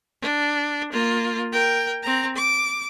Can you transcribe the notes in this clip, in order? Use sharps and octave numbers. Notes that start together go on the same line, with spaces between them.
D4
A#3 F4
A#4 G5
C4 A#5
D6